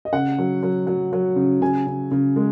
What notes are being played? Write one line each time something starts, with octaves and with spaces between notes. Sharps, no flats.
D#5
C#3 F#5
F#3
F#3
F#3
F#3
C#3
C#3 G#5
C#3
C#3
G#3